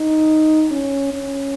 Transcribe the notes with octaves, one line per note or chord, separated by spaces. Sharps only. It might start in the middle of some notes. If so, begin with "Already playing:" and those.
Already playing: D#4
C#4
C#4